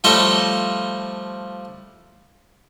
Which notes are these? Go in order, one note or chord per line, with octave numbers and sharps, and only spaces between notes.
F3 G3 A3 F4 C#5 D#5